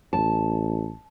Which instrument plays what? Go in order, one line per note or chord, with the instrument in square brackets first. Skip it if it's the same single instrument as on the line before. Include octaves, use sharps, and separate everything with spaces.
[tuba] A1 [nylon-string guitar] A5